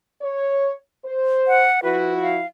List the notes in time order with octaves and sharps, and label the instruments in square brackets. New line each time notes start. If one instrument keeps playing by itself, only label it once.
[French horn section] C#5
C5
[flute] F#5
[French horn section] F3 E4 F#4 [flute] B4
[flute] F5